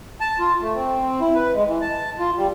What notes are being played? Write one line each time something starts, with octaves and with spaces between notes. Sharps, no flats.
A5
F4
A3
C4
E4
B4
G#3
E3
A5
F4
G3